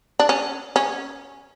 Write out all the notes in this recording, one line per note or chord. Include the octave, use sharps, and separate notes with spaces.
D4
C#4
C#4